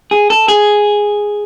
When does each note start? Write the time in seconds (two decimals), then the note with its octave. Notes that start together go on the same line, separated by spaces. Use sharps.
0.11 G#4
0.30 A4
0.48 G#4